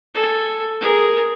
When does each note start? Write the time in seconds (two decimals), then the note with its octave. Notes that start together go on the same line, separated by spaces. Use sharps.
0.14 A4 G#5
0.81 G#4 A#4